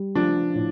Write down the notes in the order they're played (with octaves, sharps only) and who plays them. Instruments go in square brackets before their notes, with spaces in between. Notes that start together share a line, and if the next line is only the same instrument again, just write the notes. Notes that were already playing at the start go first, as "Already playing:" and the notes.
Already playing: [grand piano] G3
[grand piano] F3 [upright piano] D4
[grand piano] A2